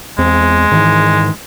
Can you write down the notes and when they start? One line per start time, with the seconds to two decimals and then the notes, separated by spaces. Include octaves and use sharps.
0.18 E2 G#3 C4
0.71 G#2 D#3 E3